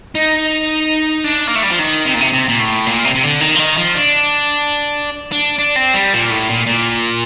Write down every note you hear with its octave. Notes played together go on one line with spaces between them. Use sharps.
D#4
D4
A#3
A3
G3
F3
D#3
C3
A#2
C3
C3
A#2
A2
A#2
C3
C3
D3
D#3
F3
D#3
F3
D4
D4
D4
C4
G3
A#2
A2
A#2
A#2